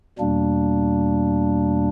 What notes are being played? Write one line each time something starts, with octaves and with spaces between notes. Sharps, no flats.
E2 B2 G3 A#3 D4